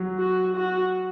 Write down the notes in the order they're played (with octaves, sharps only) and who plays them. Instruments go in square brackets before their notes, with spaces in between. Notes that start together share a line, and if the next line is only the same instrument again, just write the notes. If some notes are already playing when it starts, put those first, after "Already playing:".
Already playing: [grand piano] F#3
[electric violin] F#4
F#4